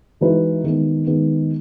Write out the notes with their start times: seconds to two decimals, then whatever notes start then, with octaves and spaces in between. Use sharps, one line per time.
0.21 E3 G#3 D#4 F#4 B4
0.64 D#3 G#3 B3
1.07 D#3 G#3 B3